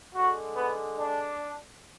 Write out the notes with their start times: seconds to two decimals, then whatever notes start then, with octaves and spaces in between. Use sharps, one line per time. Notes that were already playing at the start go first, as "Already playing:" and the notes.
0.12 D3 G#3 F#4
0.55 B3
0.98 D4